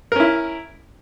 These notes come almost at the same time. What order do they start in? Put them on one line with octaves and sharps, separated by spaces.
A#4 C#4 E4